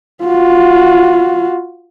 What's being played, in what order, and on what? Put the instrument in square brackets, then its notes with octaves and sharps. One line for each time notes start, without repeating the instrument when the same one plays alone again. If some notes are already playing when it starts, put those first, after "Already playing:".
[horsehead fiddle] F4 F#4